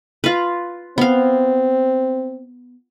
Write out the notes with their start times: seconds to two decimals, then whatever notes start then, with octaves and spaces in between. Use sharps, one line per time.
0.24 F4 B4
0.98 B3 C4 F5